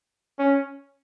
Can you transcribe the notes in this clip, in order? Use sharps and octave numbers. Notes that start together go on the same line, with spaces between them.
C#4